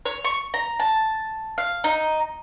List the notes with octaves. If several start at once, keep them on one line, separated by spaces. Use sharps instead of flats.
C#5
C#6
A#5
A5
F5
D#4